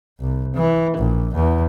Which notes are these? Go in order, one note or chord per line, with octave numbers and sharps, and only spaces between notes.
C2
E3
A#1
E2